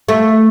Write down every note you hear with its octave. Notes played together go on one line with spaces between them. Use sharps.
A3